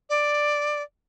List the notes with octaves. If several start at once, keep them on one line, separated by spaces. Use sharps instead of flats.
D5